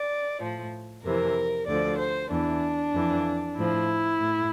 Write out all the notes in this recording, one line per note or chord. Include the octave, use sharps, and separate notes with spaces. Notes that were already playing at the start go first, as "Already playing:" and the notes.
Already playing: D5
A2 F3
F2 C3 E3 A#4
D2 D3 F3 D5
C5
E2 E3 D4
F2 E3
A2 F3 E4
A2